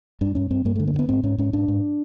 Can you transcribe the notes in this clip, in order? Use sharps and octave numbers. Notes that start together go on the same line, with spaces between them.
G2 D4
G2 C#4
G2 C4
G2 A#3
A3
D3
A#3
G2
B3
G#2 C4
G#2 C#4
G#2 C#4
G#2 D4
G#2